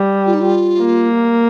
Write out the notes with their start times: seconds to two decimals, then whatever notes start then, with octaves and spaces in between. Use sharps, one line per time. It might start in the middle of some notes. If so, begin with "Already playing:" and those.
Already playing: G3
0.26 F4
0.34 D#4
0.41 F4
0.81 A#3